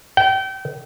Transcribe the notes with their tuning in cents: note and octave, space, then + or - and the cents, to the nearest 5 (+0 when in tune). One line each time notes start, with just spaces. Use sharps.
G5 -30